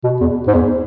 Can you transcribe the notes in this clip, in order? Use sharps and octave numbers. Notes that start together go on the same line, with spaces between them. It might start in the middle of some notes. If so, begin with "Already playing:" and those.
B2
E2
G#2
E2